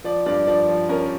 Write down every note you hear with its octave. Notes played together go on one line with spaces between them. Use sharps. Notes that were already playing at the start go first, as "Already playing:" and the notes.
F3 D5
G2 D5
F3 D5
F3
C#4 A#4